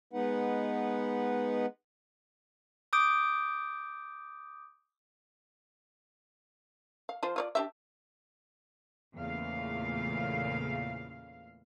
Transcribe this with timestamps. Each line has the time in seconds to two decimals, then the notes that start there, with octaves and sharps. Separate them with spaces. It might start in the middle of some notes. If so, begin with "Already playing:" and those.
0.13 G#3 B3 D#4 B4 F#5
2.93 D6 D#6 G6 D7
7.09 F5
7.23 F3 F4 C5
7.36 F4 C#5 D5
7.55 D4 G4 E5
9.15 E2 A#2 C#3 A3 F5